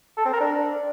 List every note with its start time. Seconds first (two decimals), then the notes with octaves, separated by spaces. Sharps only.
0.17 A4
0.25 C4
0.33 A#4
0.41 D4